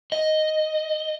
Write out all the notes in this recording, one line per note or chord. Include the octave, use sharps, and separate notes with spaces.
D#5